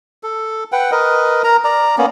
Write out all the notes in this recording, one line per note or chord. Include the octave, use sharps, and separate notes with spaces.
A4
B4 F#5 G5
A#4 B4 D#5
A#4 A#5
D5 A#5
A#3 B3 C#4